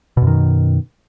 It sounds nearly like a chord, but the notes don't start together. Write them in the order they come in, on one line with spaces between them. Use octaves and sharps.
B2 F#2 D#3